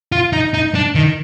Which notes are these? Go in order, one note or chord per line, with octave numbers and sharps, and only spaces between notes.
F4
D#4
D#4
D4
D#3